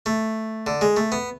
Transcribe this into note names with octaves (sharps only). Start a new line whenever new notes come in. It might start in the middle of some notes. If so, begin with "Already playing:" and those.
A3
D3
G#3
A3
B3